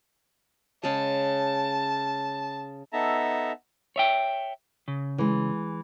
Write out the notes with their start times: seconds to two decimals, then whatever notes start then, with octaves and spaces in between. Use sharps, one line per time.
0.84 C#3 G#3 A5
2.93 B3 D#4 A4 E5 A5 A#5
3.96 C#5 E5 G5
4.88 C#3
5.18 E3 G#3